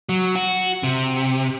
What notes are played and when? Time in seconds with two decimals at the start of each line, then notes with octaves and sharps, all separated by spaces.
0.09 F#3
0.36 F#4
0.83 C3